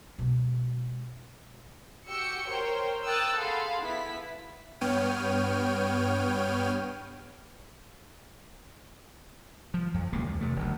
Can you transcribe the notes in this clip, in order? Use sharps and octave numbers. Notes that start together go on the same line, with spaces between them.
B2 G#3
F#4 G4 G5 E6 C#7
A#4 C5 C#5 G5
A#4 G5 D#6 E6 F#6 A6
G#4 A4 F5 F#5 B5 C6
B3 E4 B6
G2 B3 C#5 G5 F6 D#7
F3
F2
E1 C#2 D#3 A#3
E2
C3 A3
F#1 D2